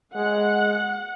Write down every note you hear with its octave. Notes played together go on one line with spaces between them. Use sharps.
G#3 F#5